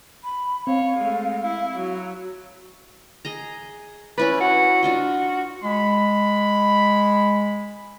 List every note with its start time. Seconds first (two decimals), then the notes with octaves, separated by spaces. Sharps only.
0.24 B5
0.67 C4 C#5 F5
0.96 G#3 A3
1.43 E4
1.75 F#3
3.25 G#4 D#5 A#5
4.18 C#4 E4 B4 D5
4.41 F#4
4.83 D4 F4 F#4 D#5
5.64 G#3 B5